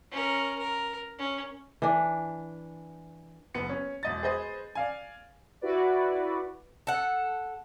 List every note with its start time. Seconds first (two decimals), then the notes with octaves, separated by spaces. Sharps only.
0.11 C#4 A#4
0.59 A#4
1.19 C#4
1.82 E3 D4
3.54 F#1 B3 C#7
3.69 C#4
4.03 E1 D#5 A6
4.23 G#4 B4 C5 D#5
4.75 D5 F5 G#5
5.61 E4 F#4 B4 D5
6.87 A4 F#5